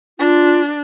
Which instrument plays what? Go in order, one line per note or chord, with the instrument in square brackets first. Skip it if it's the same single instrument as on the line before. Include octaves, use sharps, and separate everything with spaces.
[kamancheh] D4 [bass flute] F4